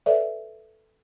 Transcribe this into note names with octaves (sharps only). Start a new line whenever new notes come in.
A4 B4 C#5 D5 E5